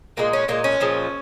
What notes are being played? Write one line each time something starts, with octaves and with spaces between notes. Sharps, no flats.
A#2 G#3 A#3
C#4
A#2 G#3 A#3
C#4
A#2 F3 G#3